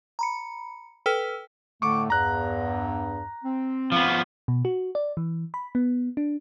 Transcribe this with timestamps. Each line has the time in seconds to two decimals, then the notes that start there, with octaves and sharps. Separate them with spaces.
0.19 A#5 B5 C#7
1.06 A4 B4 G5 E6 F6 B6
1.82 A2 D3 A3 C#6 D6
2.10 E2 G2 A#5 F#6
3.44 C4
3.92 F3 B3
4.48 B2
4.65 F#4
4.95 D5
5.17 E3
5.54 B5
5.75 B3
6.17 D4